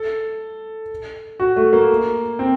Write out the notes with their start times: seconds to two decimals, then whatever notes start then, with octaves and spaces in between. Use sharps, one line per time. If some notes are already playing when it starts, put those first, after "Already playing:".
Already playing: A4
1.40 F#4
1.56 A3
1.73 A#3
2.39 C4